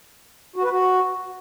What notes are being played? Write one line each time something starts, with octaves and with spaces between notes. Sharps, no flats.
F#4
B4
F#4